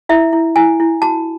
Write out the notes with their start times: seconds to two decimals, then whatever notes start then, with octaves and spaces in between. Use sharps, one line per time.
0.09 E4 E5
0.33 E4
0.56 E4 G#5
0.80 E4
1.02 F#4 A5